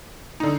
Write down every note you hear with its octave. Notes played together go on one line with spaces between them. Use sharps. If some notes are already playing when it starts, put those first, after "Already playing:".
D3 D#4